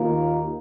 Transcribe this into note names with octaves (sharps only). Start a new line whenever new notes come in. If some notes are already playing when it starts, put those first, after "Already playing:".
Already playing: D#2 D#3 A#3 F4 A#4